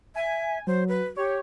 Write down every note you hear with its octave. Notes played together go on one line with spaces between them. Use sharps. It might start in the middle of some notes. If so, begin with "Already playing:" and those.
E5 G#5
F#3 C5
B4
G4 C#5